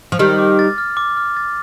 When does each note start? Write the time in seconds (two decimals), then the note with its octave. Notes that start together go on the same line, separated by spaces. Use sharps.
0.12 F3
0.19 D#3 G3 F6
0.39 D6
0.59 A6
0.78 F6
0.97 D6
1.17 F6
1.37 A6